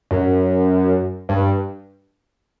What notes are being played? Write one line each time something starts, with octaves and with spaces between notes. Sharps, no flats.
F#2
G2